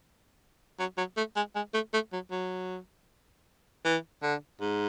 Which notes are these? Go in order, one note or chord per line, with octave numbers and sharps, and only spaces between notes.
F#3
F#3
A3
G#3
G#3
A3
A3
F#3
F#3
E3
D3
G#2